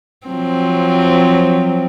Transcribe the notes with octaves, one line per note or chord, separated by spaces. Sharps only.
F3 F#3 C4